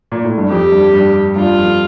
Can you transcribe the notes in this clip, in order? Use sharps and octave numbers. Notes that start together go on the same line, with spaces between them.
A#2
A2
G2
F2 G4
G2
G2
G2 F4
F2